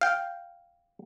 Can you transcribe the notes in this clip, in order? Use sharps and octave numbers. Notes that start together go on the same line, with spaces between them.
F5 G5